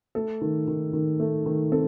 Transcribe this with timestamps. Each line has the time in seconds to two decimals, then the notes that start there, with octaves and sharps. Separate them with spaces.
0.15 A3 A4
0.41 D#3
0.67 D#3
0.93 D#3
1.20 A3
1.46 D#3
1.72 C4 A4